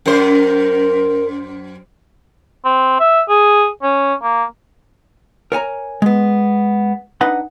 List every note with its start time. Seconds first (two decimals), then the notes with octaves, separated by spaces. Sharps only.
0.06 F#2 A#4 C5
2.65 C4
3.00 E5
3.29 G#4
3.82 C#4
4.22 A#3
5.52 A#4 C#5 G#5 A#5
6.02 G#3 B3
7.21 D4 D#4 B4 D#5 F#5 B5